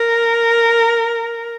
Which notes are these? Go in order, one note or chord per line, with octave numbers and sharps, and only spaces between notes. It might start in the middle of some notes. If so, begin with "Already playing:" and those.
Already playing: A#4